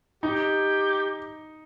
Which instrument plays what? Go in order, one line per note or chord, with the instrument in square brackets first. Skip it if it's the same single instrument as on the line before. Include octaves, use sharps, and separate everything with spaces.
[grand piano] D#4 [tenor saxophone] G4